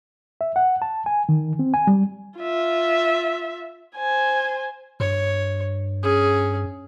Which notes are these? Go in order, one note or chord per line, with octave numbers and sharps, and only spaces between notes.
E5
F#5
A5
G#5
D#3
C4
G#5
G3
F4 E5
C5 G#5
G2 C#5
C#4 G#4